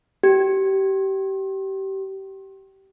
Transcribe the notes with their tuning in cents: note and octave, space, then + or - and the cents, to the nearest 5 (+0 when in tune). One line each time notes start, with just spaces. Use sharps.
G4 -25